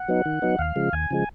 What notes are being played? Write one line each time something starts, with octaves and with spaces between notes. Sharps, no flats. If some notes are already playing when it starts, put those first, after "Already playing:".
Already playing: F#5
F#3 B3 D#4
D#3
F#3 B3 D#4
D#2 F5
C#3 F3 G#3
D#2 G#5
C#3 F3 G#3